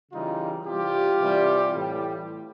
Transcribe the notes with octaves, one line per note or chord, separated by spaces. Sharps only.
C#3 E3 G3 D#4 F4
C3 E3 G3 F4 G4
C3 E3 G3
A2 E3 G3